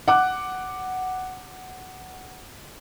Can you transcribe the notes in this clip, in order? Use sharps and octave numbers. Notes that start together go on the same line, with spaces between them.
F#5 D6 F#6